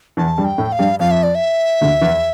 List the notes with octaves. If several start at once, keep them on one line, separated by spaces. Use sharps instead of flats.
E2 E3 A5
G2 G3
G5
A2 A3
F5
G2 G3
F2 F3 F5
E5
D5
E5
D2 D3
E2 E3